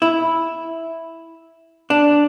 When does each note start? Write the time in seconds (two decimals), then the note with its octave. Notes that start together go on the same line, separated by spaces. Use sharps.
0.02 E4
1.90 D4